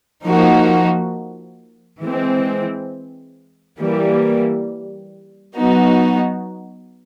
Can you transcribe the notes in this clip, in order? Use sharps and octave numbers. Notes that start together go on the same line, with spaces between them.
F3 A#3 D#4 F#4
E3 G#3 C4
E3 G3 A#3
F#3 B3 D#4 F#4